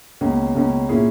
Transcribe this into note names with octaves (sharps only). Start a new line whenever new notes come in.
C#2 B2 A#3 C#4
C#2 B2 A#3 C#4
A#2 A#3 C#4 E4 G#4